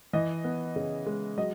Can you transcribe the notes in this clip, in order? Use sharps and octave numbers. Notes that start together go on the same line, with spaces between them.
E3 D#5
B3
C#3
G#3
F#3 D#5